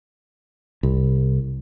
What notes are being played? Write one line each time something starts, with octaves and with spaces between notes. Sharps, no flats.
C2